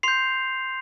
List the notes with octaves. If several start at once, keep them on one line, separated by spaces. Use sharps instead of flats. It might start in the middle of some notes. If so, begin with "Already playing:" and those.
C6 G6 C7 F7